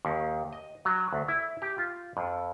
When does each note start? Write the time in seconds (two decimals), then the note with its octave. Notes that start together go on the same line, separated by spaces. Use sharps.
0.05 D#2
0.53 D#5
0.85 F#3
1.13 D2
1.28 E4
1.62 G4
1.78 F4
2.17 F2